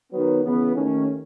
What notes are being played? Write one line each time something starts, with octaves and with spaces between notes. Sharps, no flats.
D#3 F#3 B3
C#3 E3 B3
D#2 D#3 A3 C#4